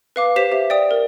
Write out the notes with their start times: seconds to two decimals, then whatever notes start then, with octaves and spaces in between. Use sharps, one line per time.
0.16 B4 F5 D6
0.36 G4 C5 B6 C7 E7
0.52 G4 E5
0.70 D5 G5 D#6
0.91 A#4